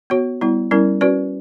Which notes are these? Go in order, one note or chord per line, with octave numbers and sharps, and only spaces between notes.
B3 F#4 C#5
G3 B3 E4
G3 C#4 E4 A#4
C#4 F#4 B4 D5